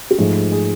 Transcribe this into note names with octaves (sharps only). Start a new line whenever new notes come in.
G4
G#2 F3 A3 G#4
G#4
G#4